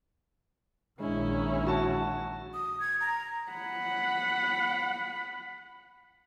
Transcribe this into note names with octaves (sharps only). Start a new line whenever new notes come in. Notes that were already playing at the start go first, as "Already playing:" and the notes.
A#1 D#3 G#3 C#4 D4 E4
F#4 A5
D#6
G#6
A#5
F#5 B5